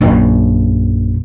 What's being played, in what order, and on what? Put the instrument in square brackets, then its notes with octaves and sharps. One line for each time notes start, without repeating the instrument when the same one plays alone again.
[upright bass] A#1 F#2